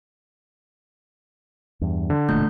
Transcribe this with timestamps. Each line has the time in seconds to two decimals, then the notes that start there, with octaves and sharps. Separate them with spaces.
1.81 E2 G2
2.10 D3
2.29 E1 E2 A#2 A3 G6